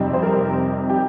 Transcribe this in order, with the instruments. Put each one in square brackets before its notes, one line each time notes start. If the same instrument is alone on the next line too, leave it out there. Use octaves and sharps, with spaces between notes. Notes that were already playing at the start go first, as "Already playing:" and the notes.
Already playing: [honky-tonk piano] F2 C3 G3 C4 D#4
C5
A#4
G4